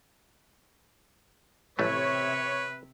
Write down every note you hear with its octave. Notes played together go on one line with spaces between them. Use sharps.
A1 C3 A3 B4 C#5 E5